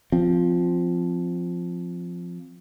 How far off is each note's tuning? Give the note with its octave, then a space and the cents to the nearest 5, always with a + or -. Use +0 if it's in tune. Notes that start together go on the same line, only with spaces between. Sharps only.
F3 +0 C4 +0